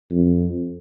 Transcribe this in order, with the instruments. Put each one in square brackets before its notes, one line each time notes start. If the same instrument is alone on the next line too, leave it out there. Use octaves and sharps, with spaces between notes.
[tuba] F2